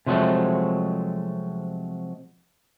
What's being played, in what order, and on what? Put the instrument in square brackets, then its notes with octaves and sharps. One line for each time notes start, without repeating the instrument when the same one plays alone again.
[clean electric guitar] C3 F3 F#3 G#3 A3